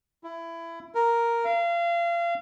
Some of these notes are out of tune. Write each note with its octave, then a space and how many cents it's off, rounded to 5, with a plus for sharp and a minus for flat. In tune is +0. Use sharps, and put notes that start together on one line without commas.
E4 +20
A#4 +0
F5 -30